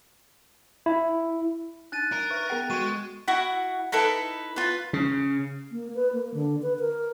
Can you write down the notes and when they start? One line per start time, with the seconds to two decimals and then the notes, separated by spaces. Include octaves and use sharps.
0.86 E4
1.92 D4 D#4 F#6 A6 D#7
2.12 A#4
2.30 B4 E5 C#6
2.50 B3 G#4 F#5 G5
2.70 G#3 F#4 A4 C#6 D#7
3.28 E4 F#4 E5 F#5
3.92 D#4 E4 A4 B4
4.56 F4 B4
4.93 C#3
5.72 A#3
5.95 B4
6.13 A#3
6.34 D3
6.62 B4
6.79 A#4